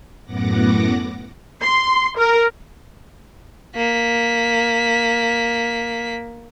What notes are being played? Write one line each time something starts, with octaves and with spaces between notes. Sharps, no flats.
F#2 A2 B3 F#5 D6 A#6
C6
A#4
A#3 B6